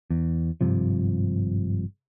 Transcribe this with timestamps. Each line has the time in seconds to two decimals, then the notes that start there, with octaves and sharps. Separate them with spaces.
0.11 E2
0.61 G#1 G2 C3 F3